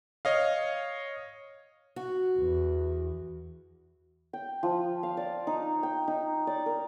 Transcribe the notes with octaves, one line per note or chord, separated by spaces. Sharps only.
C#5 D#5 F5
F#4
E2
G5
F3
F5
D5
D#4
G5
D#4
D5
A#4